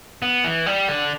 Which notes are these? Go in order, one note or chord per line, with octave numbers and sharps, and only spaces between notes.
B3
E3
G3
D3